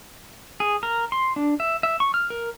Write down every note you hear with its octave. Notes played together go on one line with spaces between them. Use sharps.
G#4
A#4
C6
D4
E5
E5
C#6
F6
A#4